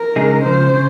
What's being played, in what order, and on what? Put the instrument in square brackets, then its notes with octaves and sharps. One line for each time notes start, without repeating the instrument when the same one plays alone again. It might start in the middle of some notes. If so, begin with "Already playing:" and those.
Already playing: [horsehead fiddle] A#4
[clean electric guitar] C#3 G#3 D#4 G#4
[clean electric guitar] C#2 C#3 F3 [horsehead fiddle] C5
[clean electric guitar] C#3